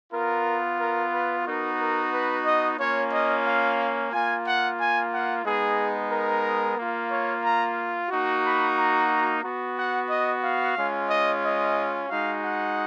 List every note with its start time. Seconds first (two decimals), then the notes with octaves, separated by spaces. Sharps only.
0.12 B3 F4 A#4
0.79 A#4
1.12 B4
1.45 B3 D#4 F#4 A#4
1.79 A#4
2.12 B4
2.44 D#5
2.78 A#3 C#4 F4 C#5
3.11 D#5
3.44 F5
4.11 A#3 F4 G#5
4.44 F#5
4.78 G#5
5.11 F#5
5.44 G#3 B3 D#4 G#4
6.10 A#4
6.77 A#3 F4
7.10 C#5
7.44 A#5
8.10 A#3 D#4 F#4
8.43 B5
8.77 A#5
9.43 B3 F#4
9.76 F#5
10.09 D#5
10.43 F5
10.76 G#3 C#4 F4
11.09 D#5
11.42 D#5
12.08 G#3 D#4 F#4 F5
12.42 F#5